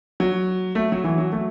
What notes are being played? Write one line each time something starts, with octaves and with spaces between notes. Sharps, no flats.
F#3
A3
F#3
E3
F#3
A3